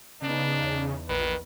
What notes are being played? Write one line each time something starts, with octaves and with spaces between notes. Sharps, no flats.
C#3 B3 D4 D#4
E2
A#1 D#3 B4